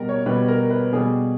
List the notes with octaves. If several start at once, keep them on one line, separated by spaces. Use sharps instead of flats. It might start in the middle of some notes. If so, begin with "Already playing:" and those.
Already playing: B2 G3 A#4
C#5
B2 G3 B4
A#4
B4
B2 G3 G#4